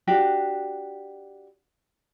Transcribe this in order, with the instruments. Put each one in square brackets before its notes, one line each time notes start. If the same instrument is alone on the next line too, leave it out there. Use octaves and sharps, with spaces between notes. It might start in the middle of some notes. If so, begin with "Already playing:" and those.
[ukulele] D4 F#4 G4